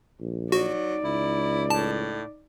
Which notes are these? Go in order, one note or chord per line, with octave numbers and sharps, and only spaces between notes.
A#1
F#3 D#4 F#4 D5
C#2 E4
A2 A5